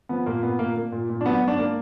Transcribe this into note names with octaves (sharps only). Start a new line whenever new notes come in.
F3 B3
A#2 A#3
A#2 B3
A#2 A#3
A#3
A#2
A#2
D4
F#3 B3
G#2 D4
A#3